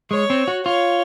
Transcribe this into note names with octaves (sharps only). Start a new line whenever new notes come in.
G#3 C#5
C4
F#4
F4 C#5